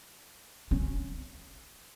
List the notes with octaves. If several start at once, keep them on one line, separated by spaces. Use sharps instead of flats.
C#4